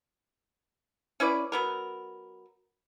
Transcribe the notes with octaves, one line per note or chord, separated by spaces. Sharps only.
C#4 E4 B4 D5
F#3 B3 A#4